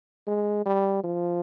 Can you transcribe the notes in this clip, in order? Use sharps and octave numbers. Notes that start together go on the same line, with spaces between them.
G#3
G3
F3